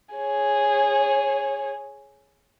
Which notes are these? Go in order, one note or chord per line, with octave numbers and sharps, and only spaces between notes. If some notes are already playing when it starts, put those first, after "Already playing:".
G#4 C#5